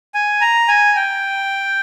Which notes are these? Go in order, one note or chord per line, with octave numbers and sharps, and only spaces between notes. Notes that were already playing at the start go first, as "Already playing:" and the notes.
G#5
A#5
G#5
G5